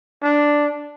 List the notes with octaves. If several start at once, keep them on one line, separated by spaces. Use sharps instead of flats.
D4